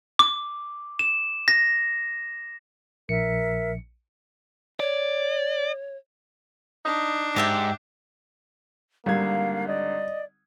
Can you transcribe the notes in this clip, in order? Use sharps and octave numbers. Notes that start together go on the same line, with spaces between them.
D6
E7
A#6
A#1 A#4 E5 C#7
C#5 D5
D4 D#4
G#2 G4 E5 G5
G#1 D3 G3 A#3 F5 G#6
D5 D#5